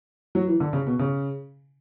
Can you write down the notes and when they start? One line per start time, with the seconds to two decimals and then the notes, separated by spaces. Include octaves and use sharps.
0.35 F#3
0.47 E3
0.60 D3
0.73 C#3
0.87 B2
0.99 C#3